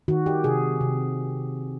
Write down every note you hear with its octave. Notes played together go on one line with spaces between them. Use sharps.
D#3 F#4
G4
C3 G#4
C3